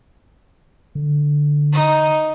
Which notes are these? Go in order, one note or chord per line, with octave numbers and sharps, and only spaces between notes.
D3
D#4